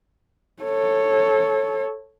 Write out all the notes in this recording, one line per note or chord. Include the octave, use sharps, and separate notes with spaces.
A4 C#5